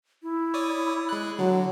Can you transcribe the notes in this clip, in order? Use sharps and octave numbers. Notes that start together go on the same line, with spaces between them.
E4
C#5 D5 D#6
G#3 F#6
D3 F#3